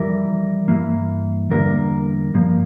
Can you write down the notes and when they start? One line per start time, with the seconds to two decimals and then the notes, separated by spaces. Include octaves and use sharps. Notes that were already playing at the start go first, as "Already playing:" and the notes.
Already playing: F2 E3 G3 A#4
0.68 G2 E3 A#3
1.51 E2 D3 G3 A#3 A#4
2.34 G2 F3 A#3